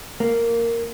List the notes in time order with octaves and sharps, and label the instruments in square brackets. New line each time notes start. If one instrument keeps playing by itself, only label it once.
[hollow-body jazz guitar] A#3